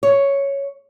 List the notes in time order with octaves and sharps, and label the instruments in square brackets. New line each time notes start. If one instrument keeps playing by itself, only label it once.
[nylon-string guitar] C#5